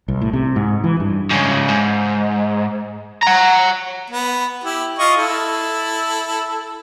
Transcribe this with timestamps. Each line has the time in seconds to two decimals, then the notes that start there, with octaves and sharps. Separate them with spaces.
0.08 C2
0.21 A2
0.33 C3
0.56 G#2
0.84 E3
1.00 G2
1.31 G#2 C#3
1.69 G#2
3.23 F#5 A#5
4.11 B3
4.64 E4 G4
4.99 F4 D#5 C#6
5.17 E4 A4